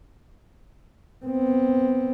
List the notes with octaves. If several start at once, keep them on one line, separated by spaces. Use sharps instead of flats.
B3 C4